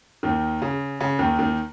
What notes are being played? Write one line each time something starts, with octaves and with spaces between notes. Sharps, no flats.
D#2 D#3
C#3
C#3
D#2 D#3
D#2 D#3